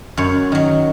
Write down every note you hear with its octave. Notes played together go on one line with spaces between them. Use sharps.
F#2 C#5
D#3 F#3